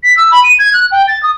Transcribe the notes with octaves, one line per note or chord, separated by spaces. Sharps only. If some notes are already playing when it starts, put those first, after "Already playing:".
B6
E6
B5
D#7
G#6
F#6
G5
A6
D#6